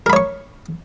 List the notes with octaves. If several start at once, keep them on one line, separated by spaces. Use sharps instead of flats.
A#4 C#5 B5 C#6